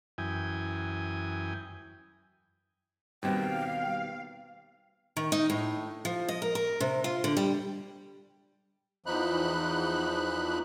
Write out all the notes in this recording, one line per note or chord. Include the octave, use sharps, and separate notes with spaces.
F#2 E3 G5 G#5 D#6
D#2 B2 G3 A#3 C4 F5 G5
D#3
D#4
A2
F3
D#5
A#4
A#4
C3
F4
D3
G3
E2 E3 F3 D#4 B5 F#6